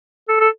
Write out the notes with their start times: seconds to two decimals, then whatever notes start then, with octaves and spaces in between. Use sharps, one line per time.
0.28 A4
0.40 A4